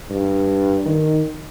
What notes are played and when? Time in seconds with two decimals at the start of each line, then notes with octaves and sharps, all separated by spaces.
0.10 G2
0.85 D#3